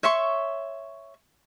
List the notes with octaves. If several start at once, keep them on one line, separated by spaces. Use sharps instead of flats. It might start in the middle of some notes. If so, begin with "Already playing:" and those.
C#5 E5 C6 C#6